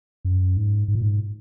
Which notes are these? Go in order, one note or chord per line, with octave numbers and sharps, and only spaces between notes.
F#2
G#2
G#2
A#2
G#2